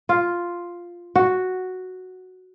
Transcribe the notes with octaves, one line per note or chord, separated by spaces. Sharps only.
F4
F#4